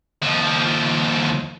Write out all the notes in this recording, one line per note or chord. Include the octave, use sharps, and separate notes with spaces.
D#2 F3